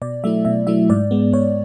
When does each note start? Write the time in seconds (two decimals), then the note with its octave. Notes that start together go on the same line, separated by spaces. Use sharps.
0.02 B2 D5
0.24 F#3 A3 E4 E5
0.45 B2 E5
0.67 F#3 A3 E4 E5
0.90 G#2 D5
1.11 G#3 B3
1.33 G#2 C#5